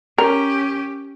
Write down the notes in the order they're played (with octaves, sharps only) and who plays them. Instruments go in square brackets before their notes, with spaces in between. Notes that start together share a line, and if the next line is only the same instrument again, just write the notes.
[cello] C#4 G4 [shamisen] A#4